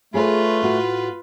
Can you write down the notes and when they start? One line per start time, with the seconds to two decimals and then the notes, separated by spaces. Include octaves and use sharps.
0.14 A3 F4 G#4 B4 C#5
0.62 A2 F#4